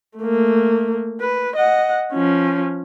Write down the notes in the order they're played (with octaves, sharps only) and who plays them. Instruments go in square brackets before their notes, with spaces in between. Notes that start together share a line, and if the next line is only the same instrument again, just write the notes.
[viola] A3 A#3
B4
D#5 F#5
F3 C#4